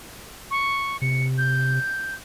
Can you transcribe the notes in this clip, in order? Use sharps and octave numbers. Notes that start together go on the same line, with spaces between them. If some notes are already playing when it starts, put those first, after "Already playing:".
C#6
C3 C#7
G6